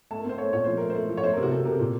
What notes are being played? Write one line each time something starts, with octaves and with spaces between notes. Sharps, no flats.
A3 A5
A#4
C4 C5
A3 C#5
A#2 C#5
F3 C5
A3 A#4
A3 C5
F3
C#5
A3 C5
C3 A#4
F#4
C3 A4
C3 A#4
A#2